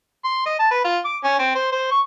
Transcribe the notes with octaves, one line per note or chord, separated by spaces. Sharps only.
C6
D#5
A5
B4
F4
D6
C#4
C4
C5
C5
C#6